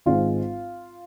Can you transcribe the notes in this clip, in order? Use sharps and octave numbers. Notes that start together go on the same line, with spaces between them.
G#1 G#2 G#3 F4